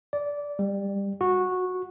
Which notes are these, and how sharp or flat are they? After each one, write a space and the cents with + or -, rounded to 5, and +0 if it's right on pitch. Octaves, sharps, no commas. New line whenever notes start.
D5 -15
G3 +20
F#4 -15